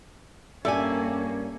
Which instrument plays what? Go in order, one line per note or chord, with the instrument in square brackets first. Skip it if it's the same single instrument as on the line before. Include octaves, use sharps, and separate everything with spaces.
[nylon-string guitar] G2 D5 G#5 [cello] A#3 C#4 [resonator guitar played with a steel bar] G4 A4 E5